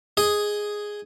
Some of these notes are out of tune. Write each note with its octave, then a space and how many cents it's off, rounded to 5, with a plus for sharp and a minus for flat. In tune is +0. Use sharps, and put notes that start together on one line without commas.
G#4 +0 D#5 +0